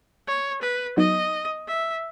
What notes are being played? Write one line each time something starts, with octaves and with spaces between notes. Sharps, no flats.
C#5
B4
F#3 B3 D#4 D#5
E5